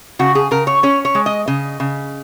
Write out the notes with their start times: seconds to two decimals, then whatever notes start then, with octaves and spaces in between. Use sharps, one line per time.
0.19 C#3 F#4
0.35 G#4
0.51 C#3 A#4
0.67 C#5
0.83 C#4 C#5
1.05 C#5
1.15 G#3
1.26 D#5
1.48 C#3 D#5
1.80 C#3